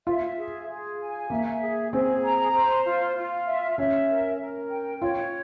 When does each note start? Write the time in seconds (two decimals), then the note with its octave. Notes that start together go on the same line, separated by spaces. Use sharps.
0.07 F4 E5
0.38 G#4
0.69 G#4
1.00 G#5
1.30 A#3 E5
1.61 G#4
1.92 C4 G#4
2.23 A#5
2.54 C5
2.86 F4
3.16 F4
3.47 E5
3.78 C#4 E5
4.09 A#4
4.40 A#4
4.71 G5
5.02 F4 C#5